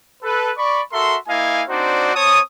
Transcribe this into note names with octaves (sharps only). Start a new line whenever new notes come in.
A4 B4
D5 B5 C#6
F#4 A4 A#4 E5 C6
A#3 E4 D#5 F5 G#5
C4 D4 D#4 F#4 C5 D5
C4 C#5 A5 D#6